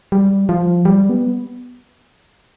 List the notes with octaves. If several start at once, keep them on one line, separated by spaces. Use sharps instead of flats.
G3
F3
G3
B3